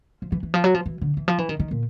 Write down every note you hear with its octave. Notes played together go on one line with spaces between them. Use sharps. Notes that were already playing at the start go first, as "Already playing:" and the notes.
F3
E3
E3
F3
F#3
F3
E3
D3
E3
F3
E3
D#3
D#3
A#2